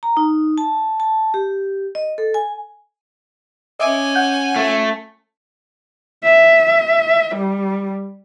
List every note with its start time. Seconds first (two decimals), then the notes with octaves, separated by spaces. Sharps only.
0.03 A#5
0.17 D#4
0.58 A5
1.00 A5
1.34 G4
1.95 D#5
2.18 A4
2.34 G#5
3.79 C#4 D#5 E5 G#5 D6
4.15 F#5 G6
4.56 A3 F4 A4
6.24 E5
7.36 G3